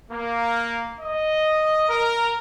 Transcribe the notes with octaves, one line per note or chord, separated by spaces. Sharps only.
A#3
D#5
A#4